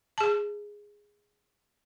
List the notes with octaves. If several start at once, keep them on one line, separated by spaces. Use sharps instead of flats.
G#4 A5